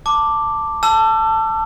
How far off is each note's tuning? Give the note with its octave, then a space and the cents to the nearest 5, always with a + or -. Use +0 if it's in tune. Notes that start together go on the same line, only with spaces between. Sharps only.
A5 +15 D6 +0
A5 +10 E6 +35